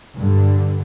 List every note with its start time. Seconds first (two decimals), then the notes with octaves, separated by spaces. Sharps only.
0.17 G2 D3